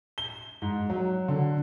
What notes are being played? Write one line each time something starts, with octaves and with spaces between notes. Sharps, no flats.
G7
G#2
F#3
D3